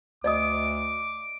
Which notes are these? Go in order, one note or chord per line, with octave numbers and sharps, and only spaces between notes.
D2 D5 D#5 D6 D#6